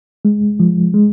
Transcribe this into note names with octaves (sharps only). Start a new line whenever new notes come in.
G#3
F3
G#3